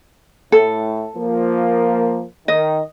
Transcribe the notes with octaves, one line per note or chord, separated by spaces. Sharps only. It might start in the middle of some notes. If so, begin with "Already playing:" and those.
A2 A4
F3 A#3
D#3 D#5